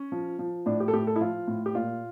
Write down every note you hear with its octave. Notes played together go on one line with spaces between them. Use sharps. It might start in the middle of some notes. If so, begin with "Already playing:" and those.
Already playing: C#4
F3
F3
A2 D4
G4
A4
A2 G4
A4
E4
F3 F4
A2
G4
A#2 F4